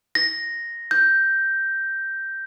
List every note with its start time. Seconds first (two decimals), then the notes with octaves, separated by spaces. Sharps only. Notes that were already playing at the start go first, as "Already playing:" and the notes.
0.15 A#6
0.91 G6